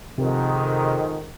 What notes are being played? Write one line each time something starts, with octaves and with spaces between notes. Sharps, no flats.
F2 G#2 C3 D#3